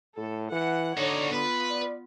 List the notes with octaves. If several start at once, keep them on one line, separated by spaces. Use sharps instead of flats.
A2 A4
E3 F#5
D3 D#4 F#4 C#5 D5
B3 F4 B4
D5